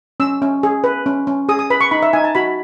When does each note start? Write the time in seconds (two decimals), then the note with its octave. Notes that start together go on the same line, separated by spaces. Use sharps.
0.20 C#4 E6
0.42 C#4
0.63 G#4
0.84 B4
1.06 C#4
1.27 C#4
1.49 G#4 D#6
1.59 D#6
1.70 B4 B5
1.81 C#6
1.91 D#4 B5
2.02 E5
2.13 D#4 G#5
2.24 A5
2.35 F#4 B5